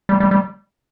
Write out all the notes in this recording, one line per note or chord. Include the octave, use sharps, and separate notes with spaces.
G3
G3
G3